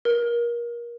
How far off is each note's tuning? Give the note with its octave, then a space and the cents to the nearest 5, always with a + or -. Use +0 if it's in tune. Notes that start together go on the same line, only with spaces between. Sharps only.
A#4 +25